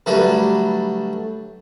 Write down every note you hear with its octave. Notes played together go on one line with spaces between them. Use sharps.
D3 F#3 G3 A3 B4